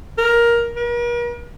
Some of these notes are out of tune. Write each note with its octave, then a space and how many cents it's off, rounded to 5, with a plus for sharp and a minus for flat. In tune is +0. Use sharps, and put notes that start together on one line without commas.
A#4 +10
A#4 +45